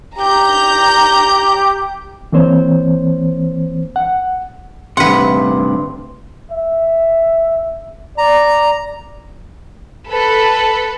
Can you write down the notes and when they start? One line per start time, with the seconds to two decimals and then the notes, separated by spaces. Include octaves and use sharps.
0.19 G4 A#5 G6
2.32 E3 A#3 C4 C5 C#5
3.96 F#5
4.97 D2 G2 C3 B4 F#5 C6
6.51 E5
8.18 D5 A#5
10.08 A4 B4 B5